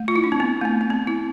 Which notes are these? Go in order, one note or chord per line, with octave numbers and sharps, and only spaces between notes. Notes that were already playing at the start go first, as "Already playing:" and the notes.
Already playing: A3
F4
E4
D4
C4
B3
A3
B3
B3
C4
E4